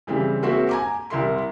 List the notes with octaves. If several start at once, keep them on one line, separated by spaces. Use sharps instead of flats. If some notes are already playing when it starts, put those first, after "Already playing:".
C#3 E3 G3 C4
G#3 A#3 C4 F#4 C5 E5
G#5 A#5 D6
C2 E4 A#4 C6